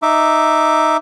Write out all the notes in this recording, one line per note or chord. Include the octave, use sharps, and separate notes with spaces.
D#4 E5 D6